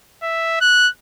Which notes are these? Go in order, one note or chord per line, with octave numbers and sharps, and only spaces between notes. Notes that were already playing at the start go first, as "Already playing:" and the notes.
E5
F#6